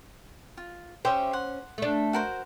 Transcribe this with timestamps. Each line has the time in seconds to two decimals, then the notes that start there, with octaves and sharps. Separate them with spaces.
0.57 F4
1.05 C#4 G4 C5 E5
1.33 F#5 C6
1.78 A3 D4
2.13 F#4 A#4 C5